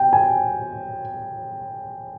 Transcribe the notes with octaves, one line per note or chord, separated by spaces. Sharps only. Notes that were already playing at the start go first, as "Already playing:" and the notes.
Already playing: G5
G#5